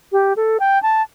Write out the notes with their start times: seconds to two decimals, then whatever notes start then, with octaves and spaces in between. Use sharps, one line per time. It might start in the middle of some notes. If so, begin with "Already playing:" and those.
0.12 G4
0.36 A4
0.60 G5
0.82 A5